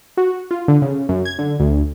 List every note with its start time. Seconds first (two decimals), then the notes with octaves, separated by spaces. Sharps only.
0.17 F#4
0.51 F4
0.68 D3
0.82 C#3
1.09 F#2
1.25 G#6
1.39 D3
1.60 D2